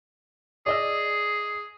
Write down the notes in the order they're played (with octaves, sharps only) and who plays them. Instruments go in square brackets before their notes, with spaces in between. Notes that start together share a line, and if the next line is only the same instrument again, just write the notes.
[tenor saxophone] G#4 [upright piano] D5 D#5 E6